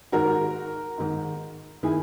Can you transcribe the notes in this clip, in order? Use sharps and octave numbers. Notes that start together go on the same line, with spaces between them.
G#2 D#3 F#4 A#4
G#2 D#3
D#3 E4 G#4